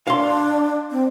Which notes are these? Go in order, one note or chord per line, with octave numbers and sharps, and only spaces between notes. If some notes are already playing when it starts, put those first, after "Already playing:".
D4 F5 C6
C4